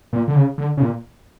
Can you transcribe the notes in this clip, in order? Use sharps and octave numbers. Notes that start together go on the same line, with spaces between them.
A#2
D3
C#3
D3
C#3
A#2